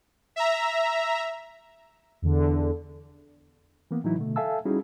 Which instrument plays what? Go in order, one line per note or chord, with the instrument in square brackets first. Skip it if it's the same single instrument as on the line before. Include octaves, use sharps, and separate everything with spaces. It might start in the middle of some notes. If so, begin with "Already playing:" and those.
[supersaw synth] E5 A#5
[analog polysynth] E2 D3
[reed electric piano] E3 A#3 B3
A2 E3 F#3 D#4 E4
B2 D3 A3
A4 E5 F5 G#5 A5 E6
G3 C#4 D#4 E4 F#4 G#4